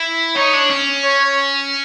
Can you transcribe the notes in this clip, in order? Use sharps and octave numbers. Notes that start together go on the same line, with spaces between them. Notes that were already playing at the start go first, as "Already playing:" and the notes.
Already playing: E4
D#4 C#5
D4
C#4
C#5